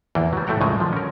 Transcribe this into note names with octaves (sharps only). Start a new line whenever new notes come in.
E2 E3 A#3 G5
F#3 G3
A2 A3 F#4 G5 A#5
A#1 A2 C#3 F#3 G#3 D#5
D3 F3
C#4 A#4